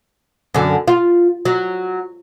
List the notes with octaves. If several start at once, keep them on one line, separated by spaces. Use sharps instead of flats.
F#2 D3
F4
F#3